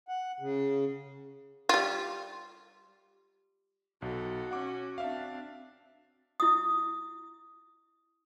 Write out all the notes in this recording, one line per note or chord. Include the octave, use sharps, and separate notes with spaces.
F#5
C#3
G3 F4
B1 F#4 A4
C#4 F#5 D6
C4 D4 E5 F5
E4 D#6